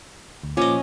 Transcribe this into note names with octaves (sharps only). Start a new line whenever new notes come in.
D2
A#2 F3 C#4 D#5 D6